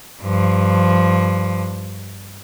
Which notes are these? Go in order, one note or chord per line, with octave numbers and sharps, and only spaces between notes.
G2 F3